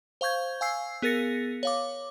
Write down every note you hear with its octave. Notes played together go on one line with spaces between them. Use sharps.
C5 F5 C#6 G6 G#6
F5 G#5 E6 C7
B3 G#4 A#4 A6 A#6 C#7
C#5 F5 D6